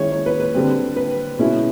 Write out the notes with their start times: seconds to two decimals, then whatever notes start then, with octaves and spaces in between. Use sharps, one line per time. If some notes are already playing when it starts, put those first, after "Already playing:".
Already playing: D#3 G#3 C#4 E4 C#5
0.12 C#5
0.26 B4
0.40 B4
0.55 D3 G3 C4
0.96 B4
1.39 B2 G#3 C#4 E4